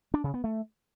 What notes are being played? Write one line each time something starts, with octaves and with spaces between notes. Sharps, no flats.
D4
C#3
B3
A3